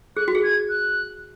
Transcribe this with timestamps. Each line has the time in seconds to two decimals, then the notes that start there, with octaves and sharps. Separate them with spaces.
0.16 G#4 F#6
0.28 F#4
0.35 G#4
0.44 G#6
0.69 F#6